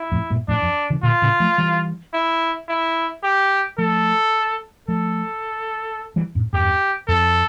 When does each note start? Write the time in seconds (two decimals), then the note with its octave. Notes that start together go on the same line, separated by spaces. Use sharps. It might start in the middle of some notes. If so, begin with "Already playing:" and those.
Already playing: E4
0.12 F2 A2
0.30 G2 A#2
0.48 F2 A2 D4
0.62 F2
0.90 C#3 E3
1.03 A#2 D3 F4
1.22 A2 C#3
1.40 F3 A3
1.58 E3 G3
2.13 E4
2.68 E4
3.23 G4
3.78 F3 A3 A4
4.88 F3 A3 A4
6.16 E3 G3
6.35 F2 A2
6.53 E2 G2 G4
7.08 F2 A4